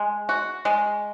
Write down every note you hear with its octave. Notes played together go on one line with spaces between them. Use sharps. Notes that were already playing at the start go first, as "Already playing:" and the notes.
Already playing: G#3
F#4
G#3